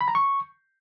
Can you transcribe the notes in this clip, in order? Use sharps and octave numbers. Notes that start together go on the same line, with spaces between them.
B5
A#5
C#6